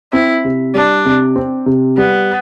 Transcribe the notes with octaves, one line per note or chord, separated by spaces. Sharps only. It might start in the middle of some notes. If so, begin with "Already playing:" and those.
C4 E4
C3
G3 D4
C3
C4
C3
G3 B3